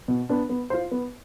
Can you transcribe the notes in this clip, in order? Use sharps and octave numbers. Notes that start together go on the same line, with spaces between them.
B2
B3 D4
B3
F4 C5
B3